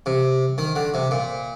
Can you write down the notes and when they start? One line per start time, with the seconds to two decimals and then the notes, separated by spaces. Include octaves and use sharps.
0.06 C3
0.58 D#3
0.76 D3
0.94 C3
1.11 A#2